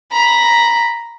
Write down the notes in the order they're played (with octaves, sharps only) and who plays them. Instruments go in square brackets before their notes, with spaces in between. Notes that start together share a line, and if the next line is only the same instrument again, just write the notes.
[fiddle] A#5 B5